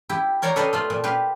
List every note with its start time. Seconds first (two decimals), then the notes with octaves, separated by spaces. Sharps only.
0.09 E4 G4
0.42 A#4 C#5 D5 F5 G5 A#5
0.56 A4 B4 D5 D#5 F5 G5
0.73 A3 F4 F5
0.90 A#2
1.04 G4 B4 F5